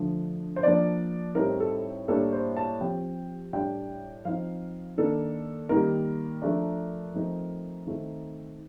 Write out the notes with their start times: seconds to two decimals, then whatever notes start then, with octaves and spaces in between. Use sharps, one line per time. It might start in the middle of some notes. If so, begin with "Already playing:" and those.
Already playing: D3 F3 A3
0.56 C5
0.63 F3 A#3 D4 D5
1.35 A2 G3 C4 D#4 A#4
1.60 A4
2.08 A2 G3 A#3 D4 A4
2.33 C5
2.57 A5
2.80 C3 F3 C4 G5
3.53 A2 G3 D4 G5
4.25 F3 C4 D#4 F5
4.98 D#3 A#3 D4 A4
5.69 D#3 G3 A#3 D#4 A#4
6.42 F3 A3 D4
7.14 F3 A3 C4 D#4
7.87 D#3 A3 C4 D#4